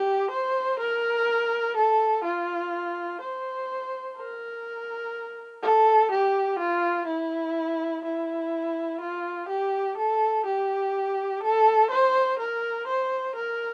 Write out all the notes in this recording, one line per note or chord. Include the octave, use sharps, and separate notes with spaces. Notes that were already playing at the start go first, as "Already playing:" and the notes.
Already playing: G4
C5
A#4
A4
F4
C5
A#4
A4
G4
F4
E4
E4
F4
G4
A4
G4
A4
C5
A#4
C5
A#4